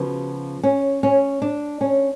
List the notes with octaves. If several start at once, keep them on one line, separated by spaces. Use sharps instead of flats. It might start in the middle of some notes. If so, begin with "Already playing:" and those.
Already playing: C#3 F3 B3 F#4
C#4
C#4
D4
C#4